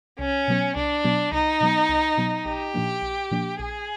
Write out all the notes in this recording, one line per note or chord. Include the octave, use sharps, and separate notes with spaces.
C2 C#4
B2 F#3 B3
C2 D4
B2 F#3 B3
C2 D#4
B2 F#3 B3
C2
B2 F#3 B3
A#1 G4
A#2 F3 A#3 D4
A#1
A#2 F3 A#3 D4
A#1 G#4